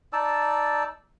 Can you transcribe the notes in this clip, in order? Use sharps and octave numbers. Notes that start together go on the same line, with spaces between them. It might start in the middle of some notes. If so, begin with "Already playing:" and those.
D#4 D5 A5 E6